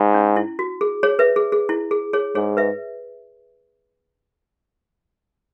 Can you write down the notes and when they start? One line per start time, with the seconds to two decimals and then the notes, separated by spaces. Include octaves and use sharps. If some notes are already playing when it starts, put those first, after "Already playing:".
Already playing: G#2
0.15 C#4
0.36 E4
0.59 F#4
0.81 G#4
1.03 G#4 C#5
1.19 B4 E5
1.36 G#4
1.52 G#4
1.69 E4
1.91 G#4
2.13 G#4 C#5
2.35 G#2 G#4 C#5
2.57 B4 E5